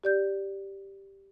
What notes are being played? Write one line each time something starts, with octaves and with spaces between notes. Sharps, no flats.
G4 D5 G6